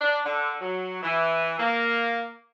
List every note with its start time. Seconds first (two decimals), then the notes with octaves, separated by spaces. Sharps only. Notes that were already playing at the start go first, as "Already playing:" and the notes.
0.01 D4
0.25 D3
0.61 F#3
1.03 E3
1.59 A#3